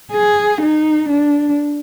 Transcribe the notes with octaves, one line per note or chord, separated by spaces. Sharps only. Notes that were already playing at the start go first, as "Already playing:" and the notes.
G#4
D#4
D4